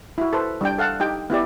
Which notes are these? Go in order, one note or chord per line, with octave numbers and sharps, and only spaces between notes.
E4 F#4
A4 B4 C5
G3 D4 D5 G5
A4 F5 F#5 A5
D#4 G4 G5
B3 E4 G4 D5